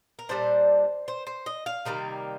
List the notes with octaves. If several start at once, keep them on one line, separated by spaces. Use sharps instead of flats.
A#4
A#2 G3 D4 C5
C5
C5
D#5
F5
C3 D#3 G3 A#3